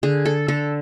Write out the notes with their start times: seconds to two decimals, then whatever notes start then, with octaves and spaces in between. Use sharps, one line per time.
0.03 D3 G#4
0.25 A4
0.48 D3 A4